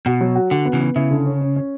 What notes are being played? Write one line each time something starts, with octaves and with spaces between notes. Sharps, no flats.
B2 F#4
F#3
F#4
D3 F#4
B3
C#3 E3
B3
C#3 E4
D3
C#4
C#4
C#4